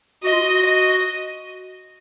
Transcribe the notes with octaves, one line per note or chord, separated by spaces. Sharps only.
F#4 D#5
F4
F#4
D#5